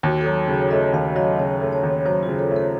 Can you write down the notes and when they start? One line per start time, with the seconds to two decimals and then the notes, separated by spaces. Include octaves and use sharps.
0.03 D#2 F#4
0.21 F#3 A4
0.48 C#3
0.54 C#5
0.71 A3 D#5
0.93 D#2 F5
1.16 F#3 D#5
1.39 C#3 C#5
1.61 A3
1.73 C#5
1.83 D#2
2.05 F#3 C5
2.23 F4
2.28 C#3
2.39 A4
2.51 A3
2.56 A4